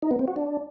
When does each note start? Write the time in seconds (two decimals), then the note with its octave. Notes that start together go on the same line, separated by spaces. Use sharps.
0.02 D#4
0.11 B3
0.19 C4
0.28 F#4
0.36 D4